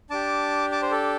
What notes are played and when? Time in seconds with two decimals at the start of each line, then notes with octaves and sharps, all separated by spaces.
0.10 D4 G4 A5 D6
0.72 A5 D6
0.82 C5
0.91 A4